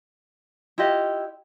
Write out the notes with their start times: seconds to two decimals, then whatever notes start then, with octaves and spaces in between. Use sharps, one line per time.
0.78 E4 F4 G4 D#5